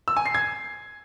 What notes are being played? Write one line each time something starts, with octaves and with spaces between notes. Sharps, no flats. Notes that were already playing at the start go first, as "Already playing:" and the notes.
E6
G#5
C7
G#6